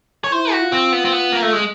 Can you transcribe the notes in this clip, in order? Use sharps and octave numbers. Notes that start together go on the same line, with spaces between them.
C#5
E4 C5
F#4
F4
C4
B3
C4
B3
A#3
A3
G#3